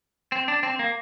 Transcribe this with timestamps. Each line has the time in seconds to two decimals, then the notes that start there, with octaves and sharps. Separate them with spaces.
0.32 C4
0.48 D4
0.63 C4
0.79 A#3